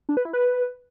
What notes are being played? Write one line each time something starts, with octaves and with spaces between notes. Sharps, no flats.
D4
B4
E4
B4